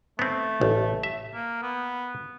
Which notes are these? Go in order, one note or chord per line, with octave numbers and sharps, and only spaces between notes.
A3 B3 C4
A1
E5
A#3
B3